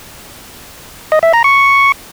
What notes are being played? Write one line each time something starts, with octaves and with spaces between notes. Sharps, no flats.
D#5
E5
A#5
C#6